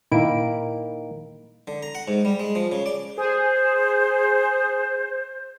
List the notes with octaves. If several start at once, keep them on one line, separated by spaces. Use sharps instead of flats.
A#2 D#3 A#3 E4 D7
D3
A#5
F#5
G#2
G3
G#3
F3
C#3
D5
G#4 C5